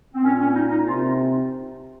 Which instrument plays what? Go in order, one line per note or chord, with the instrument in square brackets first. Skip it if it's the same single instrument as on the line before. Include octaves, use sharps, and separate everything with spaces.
[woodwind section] C4
[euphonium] A#2 [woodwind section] C#4
[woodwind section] C#4
D#4
D#4
[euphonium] C3 [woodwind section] F4